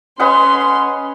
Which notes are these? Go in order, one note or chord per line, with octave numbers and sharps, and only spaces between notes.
C#4 B4 D#5 F#5 C6